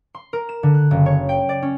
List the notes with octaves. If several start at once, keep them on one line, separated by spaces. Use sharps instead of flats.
C6
A#4
E7
D3
F#6
F#1
C#5
G5
D5
C#4